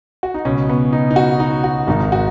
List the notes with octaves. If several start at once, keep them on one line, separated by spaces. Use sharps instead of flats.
F#4
D#4
C#2 B2 C#4
B3
D#4
D#4
F#4
D#4
F#4
G#1 G#2 D#3 D#4
F#4